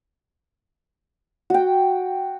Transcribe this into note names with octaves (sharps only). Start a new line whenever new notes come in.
F#4 G5